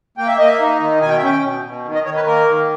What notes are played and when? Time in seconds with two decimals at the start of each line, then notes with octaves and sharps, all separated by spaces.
0.18 A#3 G5
0.28 E5
0.38 A#3 D#5
0.48 E5
0.60 D#4
0.80 D#3
1.01 B2 G#5
1.09 G5
1.18 E5
1.22 C#4 G5
1.44 B2
1.64 B2
1.85 D#3
1.95 D#5
2.05 D#3 C#5
2.16 B4
2.27 A#3 A#4
2.47 D#3